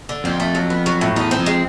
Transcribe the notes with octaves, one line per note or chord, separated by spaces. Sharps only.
D3
F2 C4
A3
F#3
B3
F#3
A2
E2 D#4
C4
F2
G#3